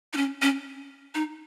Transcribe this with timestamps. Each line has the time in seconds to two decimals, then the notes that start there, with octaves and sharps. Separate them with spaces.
0.13 D#4
0.17 C#4
0.42 C#4
1.15 D#4